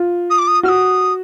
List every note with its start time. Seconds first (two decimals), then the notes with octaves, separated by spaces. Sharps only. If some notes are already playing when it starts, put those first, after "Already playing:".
Already playing: F4
0.30 D#6
0.38 D6
0.47 D#6
0.63 F#4 F6
0.68 D#6